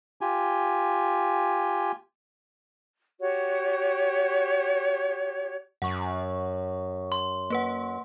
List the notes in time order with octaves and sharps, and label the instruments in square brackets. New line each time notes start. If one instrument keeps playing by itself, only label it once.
[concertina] F4 G4 G#5
[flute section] F#4 G4 C#5
[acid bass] F#2 [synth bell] F#5 C#6
[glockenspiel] C6
[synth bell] A#3 B4 F#5